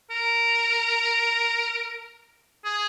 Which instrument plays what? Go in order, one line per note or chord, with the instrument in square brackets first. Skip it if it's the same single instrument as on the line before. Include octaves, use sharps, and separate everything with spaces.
[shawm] A#4
G#4